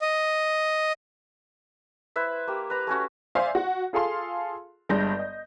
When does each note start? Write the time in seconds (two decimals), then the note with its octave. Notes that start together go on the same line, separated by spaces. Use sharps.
0.02 D#5
2.16 E4 B4 C5 E5
2.47 A#3 G4
2.70 B4 A#5
2.87 A3 C#4 F#4
3.35 C5 D5 E5 F5 G#5 C6
3.55 F#4
3.93 F4 G#4 A4 F5 C6
4.89 G1 G2 G#3 G6 A#6
5.19 D#5